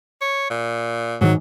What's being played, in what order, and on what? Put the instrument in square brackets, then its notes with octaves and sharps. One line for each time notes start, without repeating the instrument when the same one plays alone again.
[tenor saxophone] C#5
A#2
[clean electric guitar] G#2 D#3 [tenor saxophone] F#3